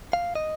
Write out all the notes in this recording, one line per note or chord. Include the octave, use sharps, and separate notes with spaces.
F5
D#5